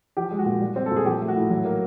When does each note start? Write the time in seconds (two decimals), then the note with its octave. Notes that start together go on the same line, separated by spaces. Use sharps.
0.17 F3 G4
0.31 G#3
0.38 F#4
0.46 A#2
0.61 G3
0.76 C4
0.86 A4
0.91 A#2
0.96 G#4
1.05 F3 G4
1.20 A3
1.28 F#4
1.35 A2
1.50 F#3
1.65 A#3